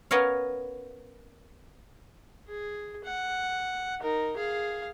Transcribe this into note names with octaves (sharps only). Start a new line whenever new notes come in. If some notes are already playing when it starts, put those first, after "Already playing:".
B3 C#4 A#4 C#5 F5
G#4
F#5
D#4 A#4
G#4 F5